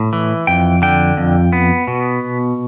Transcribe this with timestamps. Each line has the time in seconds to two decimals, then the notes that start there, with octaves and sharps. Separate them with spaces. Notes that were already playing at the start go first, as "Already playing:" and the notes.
Already playing: A2
0.13 E3
0.47 F2 G5
0.82 D3 G5
1.17 F2
1.53 B3
1.88 B2